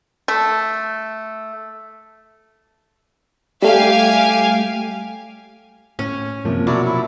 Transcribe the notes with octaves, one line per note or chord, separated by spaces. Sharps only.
A3
G3 A3 G4 F5 G#5
A2 C#4
F#2 C3 F3 A#3
B2 F#3 E4 C#5 D5
E4